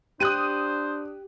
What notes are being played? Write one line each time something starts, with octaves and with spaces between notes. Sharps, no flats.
D4 G4 C5 D#6 F#6 D#7